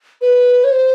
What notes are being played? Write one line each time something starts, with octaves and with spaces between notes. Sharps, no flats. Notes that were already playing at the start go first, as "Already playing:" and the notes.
B4
C#5
C5